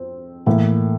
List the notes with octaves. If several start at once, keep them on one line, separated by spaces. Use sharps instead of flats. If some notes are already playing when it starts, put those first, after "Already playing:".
Already playing: F2 C4 C5
A2 E3 A#3